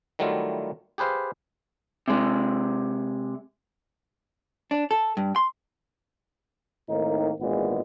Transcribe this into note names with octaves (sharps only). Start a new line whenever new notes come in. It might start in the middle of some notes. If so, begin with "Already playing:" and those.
D#3 F#3 G3 A3 E4 F4
G4 G#4 B4 C5 F5
C3 G#3
D4
A4
G2
C6
A2 D#3 A#3 C4 D#4
G#1 A#2 E3 G#3 B3